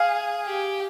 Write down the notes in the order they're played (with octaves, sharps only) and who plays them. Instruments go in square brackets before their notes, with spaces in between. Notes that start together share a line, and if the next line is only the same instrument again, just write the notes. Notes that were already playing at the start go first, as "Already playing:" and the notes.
Already playing: [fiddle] G#4 [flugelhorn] F5
[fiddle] G4